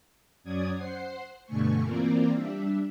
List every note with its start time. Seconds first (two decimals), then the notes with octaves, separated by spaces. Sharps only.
0.44 F#2 F#3 C#4 D5 D#6 G#6
0.76 C5 F#5 C7
1.46 G2 B2 D3 A3 G#5 C#6
1.83 E3 A#3 C4 F4 A#4 D5
2.32 G3 D4 E5